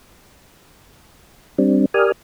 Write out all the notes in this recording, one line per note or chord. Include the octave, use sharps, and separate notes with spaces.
G3 C4 D4
G4 A#4 D5 G#5 D#6 F6